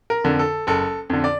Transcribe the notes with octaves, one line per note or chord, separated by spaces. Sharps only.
A#4
F2 D3
A4
F#1 A4
F2 D3
D5